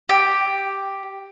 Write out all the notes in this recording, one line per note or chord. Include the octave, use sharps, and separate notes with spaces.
G4